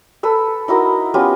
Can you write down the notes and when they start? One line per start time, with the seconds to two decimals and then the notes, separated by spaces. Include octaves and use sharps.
0.23 A4 B4 E6
0.68 D#4 E4 F#4 A#4
1.14 B3 C#4 F4 G4